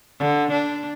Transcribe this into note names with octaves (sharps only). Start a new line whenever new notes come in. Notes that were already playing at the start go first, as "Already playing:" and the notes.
D3
D4